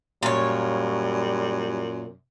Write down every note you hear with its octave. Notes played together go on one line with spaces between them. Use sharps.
F#2 A#2 G3 C#5